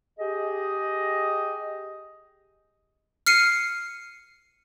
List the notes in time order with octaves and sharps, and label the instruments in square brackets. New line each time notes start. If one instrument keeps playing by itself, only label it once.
[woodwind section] G4 G#4 D#5
[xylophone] F6 C7 C#7 D#7